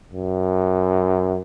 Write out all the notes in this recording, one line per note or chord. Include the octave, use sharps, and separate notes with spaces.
F#2